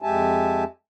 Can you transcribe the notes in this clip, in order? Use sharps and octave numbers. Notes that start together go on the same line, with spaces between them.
F2 G#3 G4 E5 G#5 A5